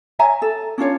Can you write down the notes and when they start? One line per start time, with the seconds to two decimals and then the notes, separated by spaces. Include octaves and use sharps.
0.19 C#5 E5 G#5 A#5
0.42 A4
0.78 C#4 D4 F4 C#5